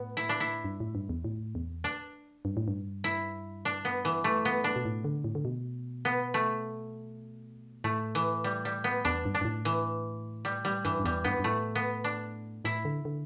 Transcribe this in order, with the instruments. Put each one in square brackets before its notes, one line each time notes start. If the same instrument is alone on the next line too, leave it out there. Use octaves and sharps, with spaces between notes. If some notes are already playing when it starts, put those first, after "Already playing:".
Already playing: [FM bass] A2 [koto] B3
[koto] E4
D4
E4
[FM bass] G2
A2
G2
E2
A2
E2
[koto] D4
[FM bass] G2
A2
G2
[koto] E4
D4
B3
E3
A3
B3
D4
[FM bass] B2
A2
D3
A2
D3
B2
[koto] B3
A3
[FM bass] A2 [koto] A3
[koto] E3
G3
G3
B3
[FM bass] E2 [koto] D4
[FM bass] G2
[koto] D4
[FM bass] G2
A2
[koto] E3
G3
G3
[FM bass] G2 [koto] E3
[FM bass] G2
[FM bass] E2 [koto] G3
[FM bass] G2 [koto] B3
[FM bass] G2
[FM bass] A2 [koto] A3
[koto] B3
D4
[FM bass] A2 [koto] E4
[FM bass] D3
D3